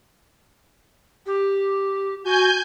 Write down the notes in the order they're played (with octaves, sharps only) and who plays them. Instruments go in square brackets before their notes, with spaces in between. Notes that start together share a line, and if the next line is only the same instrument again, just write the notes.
[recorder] G4
[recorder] F#4 [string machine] G#5 G6